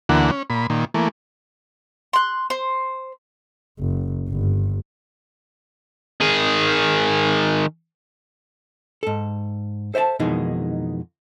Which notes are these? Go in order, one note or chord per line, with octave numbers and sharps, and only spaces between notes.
D2 D3 E3 A#3 F#5
C#4
A#2 B5
A#2 D#3
E3 A3 A#3
C6 F#6
C5
F#1
G1
D#3 G#4
G#2 A4
A4 C5 E5 G5 A5
F2 B2 D#3 E3 G#3 D#4